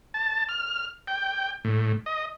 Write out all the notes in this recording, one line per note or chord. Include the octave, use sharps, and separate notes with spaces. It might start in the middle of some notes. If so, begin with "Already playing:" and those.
A5
F6
G5
A2
D#5